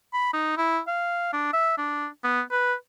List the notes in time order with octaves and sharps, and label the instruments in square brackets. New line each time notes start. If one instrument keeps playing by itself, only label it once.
[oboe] B5
D#4
E4
F5
D4
E5
D4
B3
B4